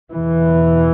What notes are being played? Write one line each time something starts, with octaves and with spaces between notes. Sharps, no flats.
E2 B2 E3